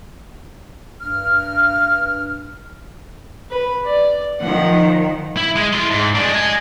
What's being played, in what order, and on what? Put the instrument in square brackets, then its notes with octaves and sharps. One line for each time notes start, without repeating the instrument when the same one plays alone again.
[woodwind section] G2 F6
[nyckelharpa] B4
D5
[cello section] D#3 F3 [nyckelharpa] F#5
[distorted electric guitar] E4
G#3
E4 C6
G#2
G#3 D4
D#5 G#5